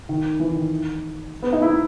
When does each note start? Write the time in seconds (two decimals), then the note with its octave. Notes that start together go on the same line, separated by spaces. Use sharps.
0.09 D#3
0.40 E3
0.55 D#3
1.43 B3
1.53 D#4
1.62 E4